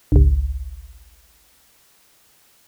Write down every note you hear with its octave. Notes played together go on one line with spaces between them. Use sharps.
G#1 C#2